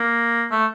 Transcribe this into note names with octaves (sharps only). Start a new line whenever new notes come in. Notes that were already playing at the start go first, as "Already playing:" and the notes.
Already playing: A#3
A3